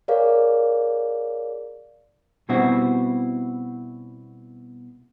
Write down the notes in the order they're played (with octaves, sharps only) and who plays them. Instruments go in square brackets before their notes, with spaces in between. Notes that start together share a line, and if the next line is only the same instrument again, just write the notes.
[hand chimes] G#4 A#4 C#5 D5 F5
[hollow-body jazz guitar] B2 G3 C4 E4 F#4